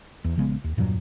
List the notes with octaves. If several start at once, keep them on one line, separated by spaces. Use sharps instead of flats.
E2
A#1 C#3 G#3 B3
D#2
E2 G2 A#2 F#3